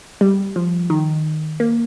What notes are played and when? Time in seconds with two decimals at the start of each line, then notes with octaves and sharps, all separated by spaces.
0.21 G3
0.56 F3
0.90 D#3
1.60 A#3